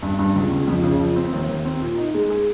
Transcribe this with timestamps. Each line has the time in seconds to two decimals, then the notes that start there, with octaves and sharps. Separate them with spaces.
0.03 G2
0.19 G2
0.35 C#2
0.51 C#2
0.68 F2
0.83 C#3
1.00 F3
1.16 C4
1.33 D#2
1.49 D#2
1.65 C4
1.81 A#2
1.98 D#4
2.14 G#3
2.30 G#4